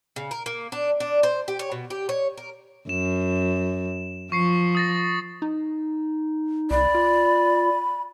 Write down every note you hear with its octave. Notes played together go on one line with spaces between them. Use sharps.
C#3
A#4
A#3
D4
D4
C5
G4
C#5
B2
G4
C#5
A#4
F#2 E7
F3 C#6 C7 C#7
D#6 A6 A#6
D#4
C2 D5 B5
F4